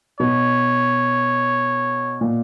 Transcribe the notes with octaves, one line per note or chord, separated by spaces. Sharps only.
B2 C#5
A#2